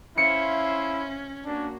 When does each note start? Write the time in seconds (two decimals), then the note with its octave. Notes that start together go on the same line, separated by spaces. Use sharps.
0.18 C#4 E4 C5 E5 F5 C#7
1.46 A#3 D4 F#4